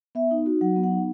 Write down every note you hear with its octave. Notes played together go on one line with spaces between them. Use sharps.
B3 E5
D#4
F#4
F#3 F#5
B3
F#5
D#4